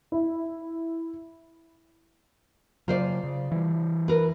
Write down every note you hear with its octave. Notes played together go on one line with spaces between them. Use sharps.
E4
C#3 F#3 F4 C5 D5
C#3
E3 G3
A#4 B4